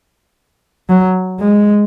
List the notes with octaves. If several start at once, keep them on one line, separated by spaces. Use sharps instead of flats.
F#3
G#3